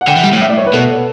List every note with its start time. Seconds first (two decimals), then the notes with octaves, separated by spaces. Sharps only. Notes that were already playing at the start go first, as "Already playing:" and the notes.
0.01 F#5
0.08 D3 G5
0.17 E3
0.24 G3
0.33 A2
0.41 E5
0.49 D5
0.58 C#5
0.66 B4
0.74 B2 A4